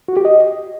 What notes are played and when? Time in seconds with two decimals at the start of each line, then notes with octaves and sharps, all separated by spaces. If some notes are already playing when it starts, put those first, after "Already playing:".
0.08 F#4
0.17 G4
0.25 D#5